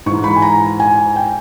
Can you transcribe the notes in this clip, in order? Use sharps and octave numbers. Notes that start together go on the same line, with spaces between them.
G#2 E3 C#6
B5
G#5
A#5
G#5
G5